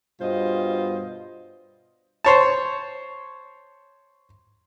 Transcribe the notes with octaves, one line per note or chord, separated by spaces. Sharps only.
G2 B2 F4 C5 D#5
C5 C#5 A5